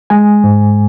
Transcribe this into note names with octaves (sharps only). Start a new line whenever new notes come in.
G#3 G#5
G#2